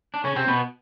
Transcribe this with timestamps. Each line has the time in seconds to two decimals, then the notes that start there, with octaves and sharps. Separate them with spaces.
0.14 D4
0.24 C#3 C#4
0.36 C3 C4
0.47 B2 B3